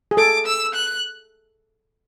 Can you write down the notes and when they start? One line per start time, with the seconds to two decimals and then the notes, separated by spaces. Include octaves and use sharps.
0.11 G#4
0.17 A4 D6
0.46 E6
0.75 F#6